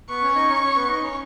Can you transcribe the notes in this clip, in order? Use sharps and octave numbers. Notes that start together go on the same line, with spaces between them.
B3 B4 C#6
C#4 C#5
D#4 D#5
C#4 C#5
C#4 C#5
B3 B4
D#4 D#5
C#4 C#5